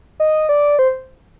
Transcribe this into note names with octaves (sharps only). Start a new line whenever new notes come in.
D#5
D5
C5